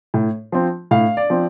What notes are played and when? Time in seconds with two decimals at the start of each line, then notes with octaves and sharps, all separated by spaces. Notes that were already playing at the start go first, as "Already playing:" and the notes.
0.14 A2
0.52 F3 C4
0.91 A2 F5
1.17 D5
1.30 F3 C4